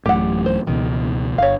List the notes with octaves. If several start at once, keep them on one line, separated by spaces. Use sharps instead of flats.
A1 F#2 A2 G4 F#5
C5
C#2 B2 D#3 E3
G1 C#5 F5